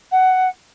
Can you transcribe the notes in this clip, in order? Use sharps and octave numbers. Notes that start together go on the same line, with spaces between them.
F#5